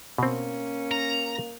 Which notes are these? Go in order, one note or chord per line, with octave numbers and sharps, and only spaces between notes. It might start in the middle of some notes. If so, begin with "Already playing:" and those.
B2 A#3 C4 C#4
A#5